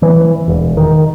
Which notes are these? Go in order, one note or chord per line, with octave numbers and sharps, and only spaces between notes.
E3
E1
D#3